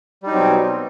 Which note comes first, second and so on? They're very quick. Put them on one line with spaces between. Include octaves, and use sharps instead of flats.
G3 D#4 F#3 C4 B2